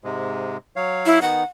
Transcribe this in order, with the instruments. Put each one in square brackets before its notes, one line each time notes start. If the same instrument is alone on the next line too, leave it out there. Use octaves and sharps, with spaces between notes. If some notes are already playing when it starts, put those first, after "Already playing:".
[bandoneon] G#2 C3 G#3
F#3 C#5 F5
[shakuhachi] E4
[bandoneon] D#3 B3 D#4 [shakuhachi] F#5